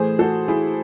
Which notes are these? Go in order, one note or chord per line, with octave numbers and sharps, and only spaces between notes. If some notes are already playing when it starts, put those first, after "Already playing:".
Already playing: A2 E3 A3 G#4 C5
F#4 A4
E4 G#4